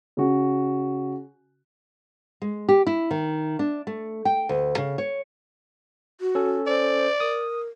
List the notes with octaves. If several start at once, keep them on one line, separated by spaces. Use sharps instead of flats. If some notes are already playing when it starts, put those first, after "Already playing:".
C#3 F#4
G#3
G4
E4
D#3
D4
A3
G5
D2
C#3
C#5
F#4
C#4 A4
C5 D5
A#4 D#6